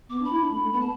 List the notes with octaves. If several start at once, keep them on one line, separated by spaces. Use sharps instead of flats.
B3 D6
D4
B5
E4
D4
A3
A3
B3 B5
A5